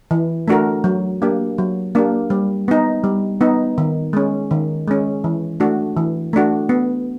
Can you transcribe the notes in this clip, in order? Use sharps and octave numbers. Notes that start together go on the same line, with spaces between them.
E3
A3 D4 F#4 A#4
F#3
A#3 D4 G4
F#3
A#3 D4 G4
G3
B3 D#4
G3
B3 D#4
D#3
G#3 C#4
D#3
G#3 C#4
E3
A3 D4 F#4
E3
A3 D4 F#4
B3